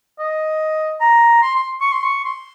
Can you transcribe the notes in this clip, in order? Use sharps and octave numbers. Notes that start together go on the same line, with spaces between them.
D#5
A#5
C6
C6
C#6
C6
C#6
C6